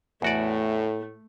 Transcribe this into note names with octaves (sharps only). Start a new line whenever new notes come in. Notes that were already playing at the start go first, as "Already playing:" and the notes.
E2 A2 A3 F#4 D5